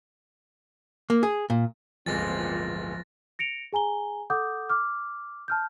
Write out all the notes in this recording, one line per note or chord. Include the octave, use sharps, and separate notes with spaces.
A#3
G#4
A#2
D1 G1 A#2 F3 G#3 C4 A6 A#6
A#6 C#7 D7 F7
G#4 G#5 A#5 G7
A4 F#5 D6 D#6 G6
D6 F6
A5 F6 G6